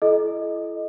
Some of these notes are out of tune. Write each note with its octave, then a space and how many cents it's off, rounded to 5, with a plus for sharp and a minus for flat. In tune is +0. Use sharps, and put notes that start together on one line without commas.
E4 +35 A4 -35 D#5 +0